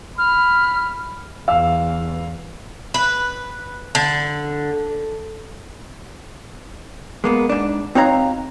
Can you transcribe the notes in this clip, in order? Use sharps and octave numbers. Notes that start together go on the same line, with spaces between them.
B5 F6
E2 F5 E6
B4
D3
G#3 A#3 B3
G#2 D4
C4 D#4 F#4 C#5 F5 A#5